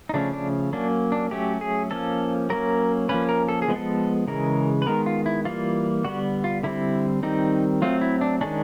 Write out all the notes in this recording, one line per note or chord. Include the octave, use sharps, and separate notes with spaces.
D#4
C#3 F3 A3 C#4 D4
D4
F#3 A#3 C#4 D4
D4
F#3 A3 C#4 G4
G#4
F3 A#3 C#4 A4
F#3 A#3 C#4 A#4
F3 A#3 C#4 B4
A#4
A4
G#4
F3 G#3 B3
A4
C#3 E3 G#3 A#4
B4
D#3 G#3 B3 A#4
F4
E4
E3 G3 A#3 F4
D3 G3 B3 F#4
F4
D3 G3 C4 E4
D#3 G3 C4 D#4
F#3 A3 C4 F4
E4
D4
D#3 G#3 C#4 D4